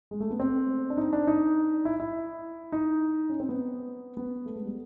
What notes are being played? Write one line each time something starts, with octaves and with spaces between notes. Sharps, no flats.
G#3
A3
B3
C4
D4
D#4
D4
D#4
E4
E4
D#4
C#4
C4
B3
B3
A3
G#3
G3